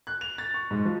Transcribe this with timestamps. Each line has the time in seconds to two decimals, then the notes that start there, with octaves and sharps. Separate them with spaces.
0.07 F#6
0.21 F7
0.38 A6
0.54 C#6
0.71 G#2
0.85 F3